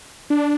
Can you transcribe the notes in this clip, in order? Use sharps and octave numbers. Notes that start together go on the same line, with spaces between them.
D4